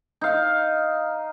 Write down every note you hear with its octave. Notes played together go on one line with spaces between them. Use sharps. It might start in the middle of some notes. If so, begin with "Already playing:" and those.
D#4 F5